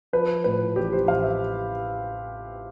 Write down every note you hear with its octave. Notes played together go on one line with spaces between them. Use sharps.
F3 B4
A2 B4
A1 G4
C5
A1 F5
E5